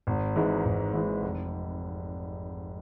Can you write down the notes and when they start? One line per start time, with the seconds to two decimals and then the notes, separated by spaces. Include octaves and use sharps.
0.07 G#1
0.36 G#2 E3 G#3
0.65 G#1
0.93 G#2 E3 G#3
1.22 F1